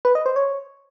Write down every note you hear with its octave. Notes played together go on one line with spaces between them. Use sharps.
B4
D#5
C5
C#5